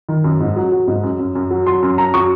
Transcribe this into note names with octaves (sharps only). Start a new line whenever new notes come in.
D#3
F#2
G#2
F#3
F#3
G#2
F#2
F#2
F#2
F#3
F#3 C6
F#2
F#2 A#5
F#3 C#6